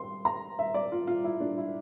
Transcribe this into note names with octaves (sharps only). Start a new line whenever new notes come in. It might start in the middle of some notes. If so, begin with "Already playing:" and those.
Already playing: C6
A#5
E5
D5
F4
F4
E4
D4
E4